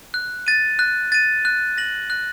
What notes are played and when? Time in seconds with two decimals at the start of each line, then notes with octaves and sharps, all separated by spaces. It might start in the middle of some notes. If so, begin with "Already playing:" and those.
0.14 F#6
0.47 A6 D#7
0.79 F#6
1.12 A6 D#7
1.45 F#6
1.78 A#6 F#7
2.10 F#6